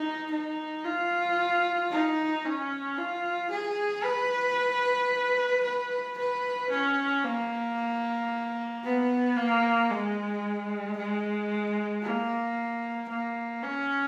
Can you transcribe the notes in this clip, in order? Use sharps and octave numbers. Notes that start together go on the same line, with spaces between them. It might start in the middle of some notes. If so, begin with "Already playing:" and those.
Already playing: D#4
D#4
F4
D#4
C#4
F4
G#4
B4
B4
B4
C#4
A#3
B3
A#3
G#3
G#3
A#3
A#3
C#4